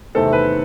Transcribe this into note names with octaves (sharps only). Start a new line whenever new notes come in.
E2 C3 D#3 A3 C4 A4
B4